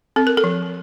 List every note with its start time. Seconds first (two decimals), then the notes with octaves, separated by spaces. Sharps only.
0.16 C4 A4
0.27 A#4
0.37 A4
0.44 F3